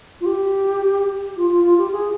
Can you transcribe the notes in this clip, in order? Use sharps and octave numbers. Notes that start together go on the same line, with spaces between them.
F4
G4
F4
F4
F4
G4
G#4